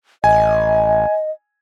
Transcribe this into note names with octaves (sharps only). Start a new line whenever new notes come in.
A1 D#5 G#5